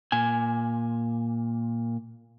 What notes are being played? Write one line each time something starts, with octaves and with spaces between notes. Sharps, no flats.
A#2 G#5